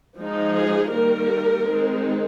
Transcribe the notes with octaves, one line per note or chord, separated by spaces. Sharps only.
F3 G#3 D#4
G#4
D#3 G3 A#3 A#4
D#3 G#3 C4 D#4